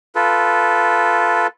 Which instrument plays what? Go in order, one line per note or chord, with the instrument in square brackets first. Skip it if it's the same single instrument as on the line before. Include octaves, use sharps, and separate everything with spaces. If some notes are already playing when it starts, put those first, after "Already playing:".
[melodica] F4 A4 B4